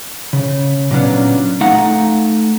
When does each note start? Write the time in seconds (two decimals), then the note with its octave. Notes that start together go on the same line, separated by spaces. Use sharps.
0.33 C#3
0.91 A#2 F#3 B3 C#4 D4
1.61 A3 D#4 F5 F#5